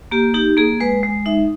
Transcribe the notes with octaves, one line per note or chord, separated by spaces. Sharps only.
A#3 G4
D#4 G4
A#3 G#4
G#3 B4
G#3
D#4 E5